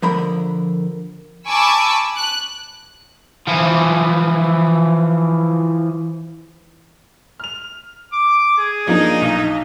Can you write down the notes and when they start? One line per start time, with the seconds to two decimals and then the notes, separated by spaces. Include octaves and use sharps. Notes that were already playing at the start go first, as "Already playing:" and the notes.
0.02 D3 F3 A#4 A#5 B5
1.47 G#5 A5 B5 C#6 D6 E6
2.16 F#6
3.47 E3 F3
7.40 F6 F7
8.13 D6
8.58 G#4
8.87 F3 A#3 D4 D#4 D#5
9.22 B1